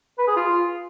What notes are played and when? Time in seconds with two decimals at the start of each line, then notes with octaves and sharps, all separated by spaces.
0.19 B4
0.28 G#4
0.36 F4